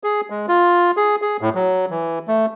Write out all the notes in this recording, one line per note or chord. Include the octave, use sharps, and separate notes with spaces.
G#4
G#3
F4
G#4
G#4
A2
F#3
E3
A3